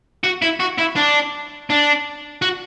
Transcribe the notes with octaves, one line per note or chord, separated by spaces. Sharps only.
F#4
E4
F#4
E4
D4
D4
F#4